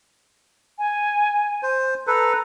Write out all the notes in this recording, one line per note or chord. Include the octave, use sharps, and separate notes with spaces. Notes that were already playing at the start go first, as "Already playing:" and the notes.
G#5
C5
A4 B4 A#5